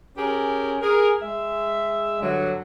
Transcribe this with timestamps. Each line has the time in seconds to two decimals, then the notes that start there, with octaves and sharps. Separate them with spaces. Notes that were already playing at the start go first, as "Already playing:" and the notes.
0.17 C#4 G4 G#4 A#4
0.82 G#4 A#4
1.22 G#3 E5
2.21 G2 D3 F#3